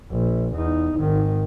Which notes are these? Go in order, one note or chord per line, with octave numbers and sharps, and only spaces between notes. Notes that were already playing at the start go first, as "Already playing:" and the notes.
A#1
E2 D#4
G#1 D#3